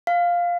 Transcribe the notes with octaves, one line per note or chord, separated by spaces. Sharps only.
F5